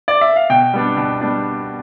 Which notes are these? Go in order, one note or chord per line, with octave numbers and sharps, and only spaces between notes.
D5
E5
F5
B2 G5
G3 B3 D4
B2
G3 B3 D4